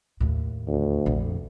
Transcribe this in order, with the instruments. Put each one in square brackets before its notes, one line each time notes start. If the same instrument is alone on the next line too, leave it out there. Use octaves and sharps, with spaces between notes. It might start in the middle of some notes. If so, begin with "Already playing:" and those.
[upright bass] D#2 A2
[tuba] D2
[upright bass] A#1 F2